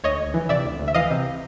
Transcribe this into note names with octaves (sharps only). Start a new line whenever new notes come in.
D2 C#5 D#5
D2
E3
C3 D5 E5
D2
D2
E5
E3 D#5 F5
C3